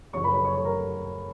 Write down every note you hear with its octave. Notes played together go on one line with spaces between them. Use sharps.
F#1 F#2 F3 C#5 C#6
B4 B5
B4 B5
C#5 C#6
C#5 C#6
A#4 A#5